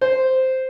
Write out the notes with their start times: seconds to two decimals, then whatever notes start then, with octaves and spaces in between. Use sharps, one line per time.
0.01 C5